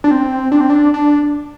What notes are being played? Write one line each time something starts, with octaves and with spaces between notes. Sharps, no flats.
D4
C4
D4
C4
D4
D4